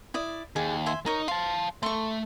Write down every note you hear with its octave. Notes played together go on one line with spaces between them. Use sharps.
E4 D5 D#6
D#2 G#4
E5 G#5 C6
D#4 A#4 C#5
F5 A5 C6
A3 C6 C#6